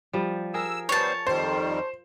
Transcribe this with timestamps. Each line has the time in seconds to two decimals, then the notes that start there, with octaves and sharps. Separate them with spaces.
0.13 F3 G3
0.54 G#4 A#4 E6
0.89 G3 B3 C5 C#5 A5
1.27 F2 D#3 G3 C5